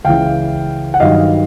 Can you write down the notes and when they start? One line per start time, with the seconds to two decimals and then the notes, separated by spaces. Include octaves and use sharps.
0.04 C#2 C#3 E3 F5 G5
0.94 F#5
1.00 G2 D#3 F#3 D#5 F5